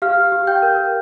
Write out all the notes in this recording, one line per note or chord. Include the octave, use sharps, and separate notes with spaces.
G4 F5 F6
G4
G5 G6
A#4